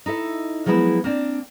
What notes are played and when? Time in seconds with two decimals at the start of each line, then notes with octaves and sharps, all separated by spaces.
0.06 D#4 E4 A4 E5
0.66 F3 F#3 G#3 B3 E4 G#4
1.04 A#3 C4 D4